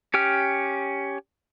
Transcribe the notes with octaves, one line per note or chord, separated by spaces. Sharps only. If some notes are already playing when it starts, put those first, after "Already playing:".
C#4 G4 G5 F6